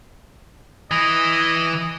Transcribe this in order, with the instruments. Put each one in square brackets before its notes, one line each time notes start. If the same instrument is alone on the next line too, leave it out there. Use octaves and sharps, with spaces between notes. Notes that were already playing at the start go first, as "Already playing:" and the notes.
[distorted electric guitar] E3 [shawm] D#5